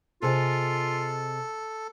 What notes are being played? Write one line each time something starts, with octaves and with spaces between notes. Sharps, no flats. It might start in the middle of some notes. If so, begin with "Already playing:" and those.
C3 F4 G#4 A4 D#5